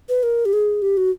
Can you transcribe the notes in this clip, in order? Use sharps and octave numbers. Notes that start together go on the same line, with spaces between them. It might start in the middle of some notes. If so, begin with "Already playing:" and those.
B4
A#4
G4
G#4
G4
F#4